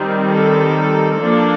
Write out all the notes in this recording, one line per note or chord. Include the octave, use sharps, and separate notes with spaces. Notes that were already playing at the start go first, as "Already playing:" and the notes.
Already playing: D#3 G3 C4
A4
F3 A#3 D4